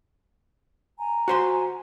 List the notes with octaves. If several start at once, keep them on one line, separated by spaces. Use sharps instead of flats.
G#5 A#5
F#4 C5 C6